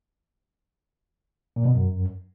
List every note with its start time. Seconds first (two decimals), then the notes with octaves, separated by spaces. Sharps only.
1.56 A#2
1.65 B2
1.75 F#2